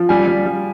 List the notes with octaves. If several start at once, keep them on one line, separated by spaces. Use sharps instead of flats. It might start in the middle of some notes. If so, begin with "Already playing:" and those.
Already playing: F3
G3 G#5
G3
G3